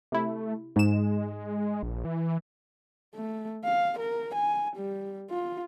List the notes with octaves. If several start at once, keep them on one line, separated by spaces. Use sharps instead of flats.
C3 A3 E4
G#2 G#3 E7
A#1
E3
A3
F5
A#4
G#5
G3
F4